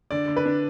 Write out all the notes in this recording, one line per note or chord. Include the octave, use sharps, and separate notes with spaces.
D3 D5
D3
B4
D4